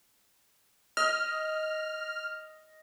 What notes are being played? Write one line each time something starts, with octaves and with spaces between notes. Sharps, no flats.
D#5 F6